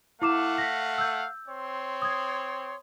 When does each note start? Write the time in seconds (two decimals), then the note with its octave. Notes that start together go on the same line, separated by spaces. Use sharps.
0.22 A3 E4 F5 F#5 D6 E7
0.58 A#6 B6
0.98 E6 G6
1.48 C4 C#5 C6
2.02 D#6 G#6